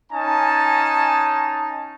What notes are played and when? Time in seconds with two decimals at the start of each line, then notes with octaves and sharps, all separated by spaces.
0.11 C#4 D#4 G#5 A5